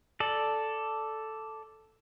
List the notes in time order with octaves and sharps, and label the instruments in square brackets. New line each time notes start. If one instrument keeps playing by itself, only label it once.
[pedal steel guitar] A4 D5